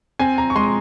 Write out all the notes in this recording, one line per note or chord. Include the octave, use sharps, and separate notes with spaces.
C4 G#5
A#5
C#6
G#3 C6